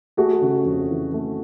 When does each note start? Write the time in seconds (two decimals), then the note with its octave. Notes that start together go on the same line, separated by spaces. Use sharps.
0.17 A3 F#4 G#4
0.41 C#3
0.65 F2
0.90 E3
1.13 A3